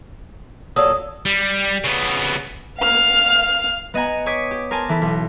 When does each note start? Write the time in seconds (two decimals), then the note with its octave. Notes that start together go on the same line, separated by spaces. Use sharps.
0.76 A#2 F#3 A4 D#6
1.26 G3
1.84 C#3 B3
2.79 F5 F6
3.94 B3 D#5 F#5 G#5 A#5
4.26 C#5 D6 D#6 G#6 B6
4.51 G4
4.71 A#4 C5 G#5 A5
4.89 E3 A4 B5
5.02 B1